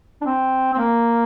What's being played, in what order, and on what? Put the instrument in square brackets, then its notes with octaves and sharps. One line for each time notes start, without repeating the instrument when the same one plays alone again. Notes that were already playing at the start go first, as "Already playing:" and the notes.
[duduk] D4
C4
C4
A#3